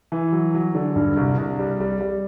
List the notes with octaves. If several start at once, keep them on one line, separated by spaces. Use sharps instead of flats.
E3
F#3
F#3
D3
G2
C2
C2
G3
G3
G3